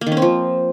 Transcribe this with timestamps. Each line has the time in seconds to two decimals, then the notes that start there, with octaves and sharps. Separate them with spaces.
0.01 A#3
0.07 D#3
0.12 C#4
0.17 C4
0.22 F3